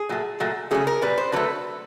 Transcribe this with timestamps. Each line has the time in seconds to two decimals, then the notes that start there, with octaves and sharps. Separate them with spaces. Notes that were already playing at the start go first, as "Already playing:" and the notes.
Already playing: G#4
0.09 A#2 F#3 A3
0.40 A#2 F#3 A3
0.71 C#3 F#3 A3 G#4
0.87 A#4
1.02 A#2 G3 B4
1.18 C5
1.32 D3 F#3 A3 B4